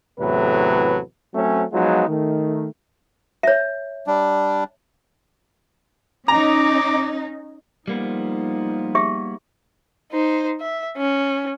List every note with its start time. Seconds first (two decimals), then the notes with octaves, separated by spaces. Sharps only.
0.20 E2 A2 C3 F#3 A4 B4
1.34 F#3 A3 C4 C#4
1.72 F3 F#3 G#3 B3 D#4 F4
2.09 D#3 A3
3.43 C#5 E5
4.07 G3 D4
6.28 C#4 D#4 A#5 D6
7.88 F3 G3 A#3 B3 D#4
8.95 G4 G#4 E5
10.12 D#4 C5
10.60 E5
10.97 C#4